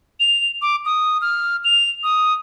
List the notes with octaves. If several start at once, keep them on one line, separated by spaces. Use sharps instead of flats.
F7
D6
D#6
F6
F7
D#6